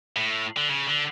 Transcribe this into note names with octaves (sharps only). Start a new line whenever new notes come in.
A2
D3
C#3
D3